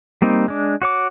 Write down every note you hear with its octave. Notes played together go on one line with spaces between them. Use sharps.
G3 A#3 C4 D#4
G#3 D4
F#4 C#5 D6